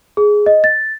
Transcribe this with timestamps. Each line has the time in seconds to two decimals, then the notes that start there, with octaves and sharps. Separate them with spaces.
0.17 G#4
0.46 D#5
0.64 A6